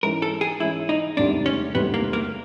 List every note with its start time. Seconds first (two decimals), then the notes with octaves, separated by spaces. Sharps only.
0.03 G#2 E3 G#3 C#4 A#4
0.22 A4
0.41 G#4
0.60 G#2 E3 G#3 C#4 E4
0.89 D#4
1.17 E1 D2 C3 D#3 G3 D4
1.46 C#4
1.75 E1 D2 C3 D#3 G3 B3
1.94 A#3
2.13 A#3